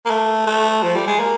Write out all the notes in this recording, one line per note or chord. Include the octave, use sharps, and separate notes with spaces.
A#3
A3
A3
F3
G3
G#3
A#3